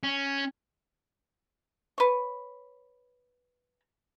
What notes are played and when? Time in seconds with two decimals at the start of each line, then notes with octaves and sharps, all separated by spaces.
0.03 C#4
1.98 B4 C#5